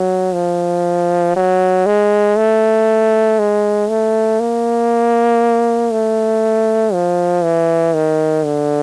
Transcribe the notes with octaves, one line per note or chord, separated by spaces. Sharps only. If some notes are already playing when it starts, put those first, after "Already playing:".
Already playing: F#3
F3
F#3
G#3
A3
G#3
A3
A#3
A3
F3
E3
D#3
D3